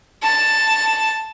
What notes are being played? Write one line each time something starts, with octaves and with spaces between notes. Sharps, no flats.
A5